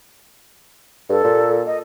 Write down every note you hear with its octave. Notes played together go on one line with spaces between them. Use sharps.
G2 A4
A#2
D#5